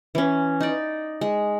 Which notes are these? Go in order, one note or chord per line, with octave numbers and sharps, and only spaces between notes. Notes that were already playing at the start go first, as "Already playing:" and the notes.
E3 C#4
D#4 D5
G#3